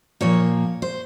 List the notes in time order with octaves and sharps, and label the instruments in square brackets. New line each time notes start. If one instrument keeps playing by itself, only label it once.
[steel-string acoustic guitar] A#2 F3 A#3 C#5
C5